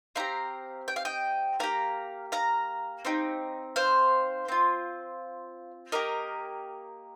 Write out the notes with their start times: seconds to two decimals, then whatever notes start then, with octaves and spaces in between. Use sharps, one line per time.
0.16 C4 D#4 G4 F5 A#5
0.88 G5
0.96 F5
1.05 D#5 G5
1.59 A#3 G4 F5 A#5
2.32 F5 A#5
3.05 C4 D#4 G4
3.76 C5 F5
4.48 C4 F4
5.92 A#3 G4 A#4 D#5